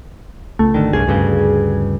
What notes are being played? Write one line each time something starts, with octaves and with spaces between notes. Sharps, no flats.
C#2 A3
G#1 D3 D#3
C2 G2 G#4
D2 G2 C#3